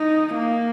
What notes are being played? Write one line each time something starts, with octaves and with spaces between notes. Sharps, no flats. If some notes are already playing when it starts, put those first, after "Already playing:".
Already playing: D#4
A#3